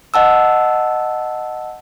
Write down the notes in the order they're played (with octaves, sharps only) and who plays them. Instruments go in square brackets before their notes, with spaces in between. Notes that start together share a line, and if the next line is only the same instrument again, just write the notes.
[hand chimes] D#5 F#5 A5 E6